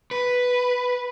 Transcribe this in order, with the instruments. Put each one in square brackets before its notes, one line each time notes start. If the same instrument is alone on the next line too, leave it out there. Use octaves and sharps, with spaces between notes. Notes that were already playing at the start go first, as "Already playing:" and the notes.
[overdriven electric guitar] B4